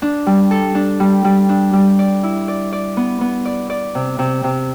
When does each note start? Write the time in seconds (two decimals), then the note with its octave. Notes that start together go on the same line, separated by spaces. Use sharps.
0.02 D4
0.26 G3
0.51 A4
0.75 D4
1.00 G3
1.24 G3
1.49 D4
1.73 G3
1.99 D5
2.23 E4
2.48 D5
2.73 D5
2.97 B3
3.21 B3
3.45 D5
3.70 D5
3.95 C3
4.19 C3
4.44 C3